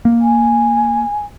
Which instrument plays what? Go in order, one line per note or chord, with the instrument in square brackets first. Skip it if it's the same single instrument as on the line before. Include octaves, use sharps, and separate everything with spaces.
[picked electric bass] A#3
[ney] G#5